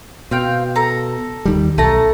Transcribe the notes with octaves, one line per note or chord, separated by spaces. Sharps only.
B2 C4 F5 G5
A4 A#5
D#2 D#3 G3
B1 A3 A5 A#5